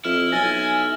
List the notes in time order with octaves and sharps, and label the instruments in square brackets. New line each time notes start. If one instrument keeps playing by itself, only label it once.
[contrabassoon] F2 [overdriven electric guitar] E4 [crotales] F6
[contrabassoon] B1 [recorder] G#5 [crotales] F6 A6 A#6